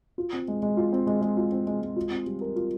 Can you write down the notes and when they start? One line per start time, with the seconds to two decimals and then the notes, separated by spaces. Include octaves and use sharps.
0.18 F4
0.33 C4
0.48 G#3
0.63 G#3
0.77 F4
0.93 C4
1.07 G#3
1.21 G#3
1.37 F4
1.52 C4
1.67 G#3
1.81 G#3
1.96 F4
2.11 C4
2.26 G3
2.41 A#4
2.56 F4